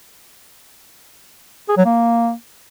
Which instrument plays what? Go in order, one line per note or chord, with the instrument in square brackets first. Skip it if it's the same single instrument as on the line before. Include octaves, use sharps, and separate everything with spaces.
[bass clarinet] G#4
F#3
A#3